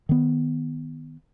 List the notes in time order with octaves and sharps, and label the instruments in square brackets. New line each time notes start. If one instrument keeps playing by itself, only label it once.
[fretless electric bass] D#3 B3